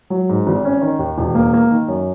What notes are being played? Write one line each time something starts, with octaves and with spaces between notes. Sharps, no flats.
F#3
G#2
G#1
C#4
D#3
D#2
E1
A#3
A#3
D#3
F#2